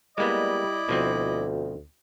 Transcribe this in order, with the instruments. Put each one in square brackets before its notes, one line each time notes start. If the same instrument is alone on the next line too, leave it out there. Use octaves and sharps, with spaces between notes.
[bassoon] G3 [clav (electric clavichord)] G#3 A#3 B3 [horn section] E4 D5 D#5
[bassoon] D2 [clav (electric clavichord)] B2 F3 C4